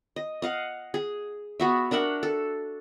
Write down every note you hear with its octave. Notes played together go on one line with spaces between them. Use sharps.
D#5
D#5 F5 F#5
G#4
B3 F#4 E5
D4 A#4 E5 F#5
A4